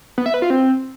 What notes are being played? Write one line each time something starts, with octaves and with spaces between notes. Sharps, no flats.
B3
E5
B4
F4
C4